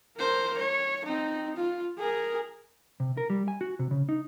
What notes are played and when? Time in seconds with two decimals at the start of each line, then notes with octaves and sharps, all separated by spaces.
0.17 A#4 C5
0.58 C#5
1.05 C4 D#4
1.57 F4
1.98 G#4 A#4
3.00 C3
3.17 A#4
3.30 G3
3.48 G#5
3.61 F#4
3.79 C3
3.91 C#3
4.09 D#4